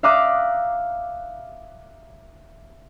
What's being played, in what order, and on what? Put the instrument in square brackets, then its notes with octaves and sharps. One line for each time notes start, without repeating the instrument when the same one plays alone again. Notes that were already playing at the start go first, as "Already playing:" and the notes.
[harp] E5 F5 A#5 D6 D#6 F#6